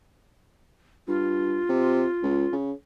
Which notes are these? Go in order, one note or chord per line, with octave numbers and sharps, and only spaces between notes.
G2 F4
C3
C#2
C#3